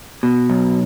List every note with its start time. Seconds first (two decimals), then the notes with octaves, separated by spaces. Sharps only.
0.23 B2
0.50 B1